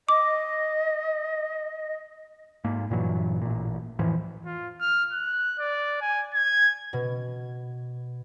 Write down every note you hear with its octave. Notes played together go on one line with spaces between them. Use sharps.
D#5 D6
G#2 A#3
G2 A#2 E3 F#3
A1 A#2
F2 A2 E3 F3
F4
F6
F#6
D5
G#5
G#6
B2